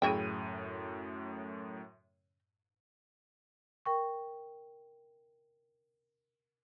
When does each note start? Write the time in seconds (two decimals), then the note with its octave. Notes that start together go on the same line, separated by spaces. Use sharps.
0.02 F#2 A2 C#3 E4 G5 D#7
3.86 A#4 G5 C#6